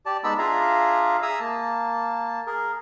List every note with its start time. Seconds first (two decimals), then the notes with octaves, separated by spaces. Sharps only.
0.06 G4 D5 A5
0.24 G#3 B3 D#4 A5 B5 E6
0.38 D4 F4 G#4 E5 F5 A#5
1.22 G#4 E5 A#5 D#6 E6
1.40 A#3 A5
2.47 G#4 A#4